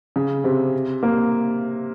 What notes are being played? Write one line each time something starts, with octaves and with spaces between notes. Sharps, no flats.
C#3
C3
A#3